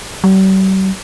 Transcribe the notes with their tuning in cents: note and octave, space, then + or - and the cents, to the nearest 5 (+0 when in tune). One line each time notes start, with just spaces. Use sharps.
G3 -45